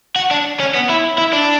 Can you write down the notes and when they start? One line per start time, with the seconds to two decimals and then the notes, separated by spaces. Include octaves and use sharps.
0.16 F#4
0.31 D4
0.60 C#4
0.74 B3
0.89 E4
1.18 E4
1.33 D4